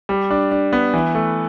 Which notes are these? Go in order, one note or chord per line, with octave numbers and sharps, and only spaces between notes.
G3
D4
D4
B3
E3
A3